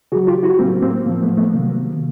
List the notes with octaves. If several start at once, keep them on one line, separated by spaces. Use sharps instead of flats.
C#3 F#3 F#4 G#4
F4 G4
E4 F#4
A2 F#3 A#3 C4
A#3 C4
A2 F3 A#3
A3 B3
A3 B3
C3 D#3 F#3 A#3